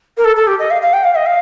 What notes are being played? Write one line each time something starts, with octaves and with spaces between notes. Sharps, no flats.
A#4
A4
A4
G4
D#5
F5
F5
G5
F5
D#5
F5